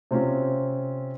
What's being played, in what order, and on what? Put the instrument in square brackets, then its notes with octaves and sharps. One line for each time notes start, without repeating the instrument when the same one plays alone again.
[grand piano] C3 C4 C#4 F4